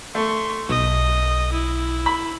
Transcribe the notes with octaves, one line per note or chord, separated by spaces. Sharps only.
A3 C6 C#6
B1 D#5
E4
B5